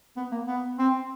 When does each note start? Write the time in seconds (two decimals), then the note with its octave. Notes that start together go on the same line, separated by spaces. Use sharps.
0.17 B3
0.32 A#3
0.47 B3
0.78 C4